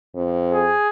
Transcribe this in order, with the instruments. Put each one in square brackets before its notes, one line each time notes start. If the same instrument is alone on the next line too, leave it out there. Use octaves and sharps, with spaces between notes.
[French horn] F2
[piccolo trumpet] G#4